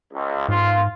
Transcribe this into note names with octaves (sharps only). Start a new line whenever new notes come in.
C#2
G#2 F4